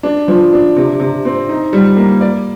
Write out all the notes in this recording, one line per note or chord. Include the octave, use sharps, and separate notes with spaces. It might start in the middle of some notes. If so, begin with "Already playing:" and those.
D4
F3
D4
C3
C3
C4
D#4
G3
A#3
D5